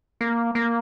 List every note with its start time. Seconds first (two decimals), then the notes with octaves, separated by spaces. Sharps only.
0.21 A#3
0.55 A#3